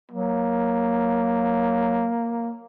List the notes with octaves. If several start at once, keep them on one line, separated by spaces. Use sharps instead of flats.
F#3 A#3